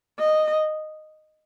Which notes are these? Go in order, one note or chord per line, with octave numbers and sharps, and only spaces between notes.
D#5